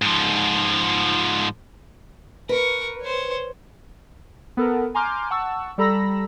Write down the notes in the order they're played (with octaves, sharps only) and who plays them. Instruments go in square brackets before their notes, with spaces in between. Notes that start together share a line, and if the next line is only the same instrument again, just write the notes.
[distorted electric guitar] G#2 F3
[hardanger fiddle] A#4 C#6 [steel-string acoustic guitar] B4
[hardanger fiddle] C5 C#5
[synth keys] B3 A4 A#4
G#5 A#5 C6 D6 F6 G6
F#5 A5 C#6 E6
G3 A4 A#5 B5 E6 A#6